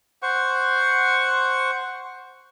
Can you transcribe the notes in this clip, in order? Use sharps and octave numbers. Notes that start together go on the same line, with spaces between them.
C5 F#5 C#6